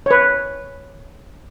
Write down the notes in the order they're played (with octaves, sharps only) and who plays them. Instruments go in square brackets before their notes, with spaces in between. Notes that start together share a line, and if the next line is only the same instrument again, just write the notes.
[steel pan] B4 C#5